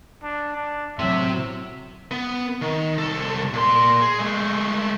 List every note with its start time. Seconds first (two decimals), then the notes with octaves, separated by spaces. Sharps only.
0.23 D4
0.56 D4
0.99 A2 C3 F#3 E5 C6
2.11 B3
2.62 D#3
2.98 C2 A4
3.54 A#2 C6
4.01 G#4
4.19 G#3 A3